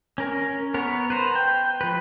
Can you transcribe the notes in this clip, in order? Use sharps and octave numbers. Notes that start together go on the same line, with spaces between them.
C#4 A#4
B3 A#4 C#5
B4 C5 A#5
G5
F3 B4